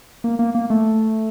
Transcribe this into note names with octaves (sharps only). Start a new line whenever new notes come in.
A#3
A#3
A#3
A3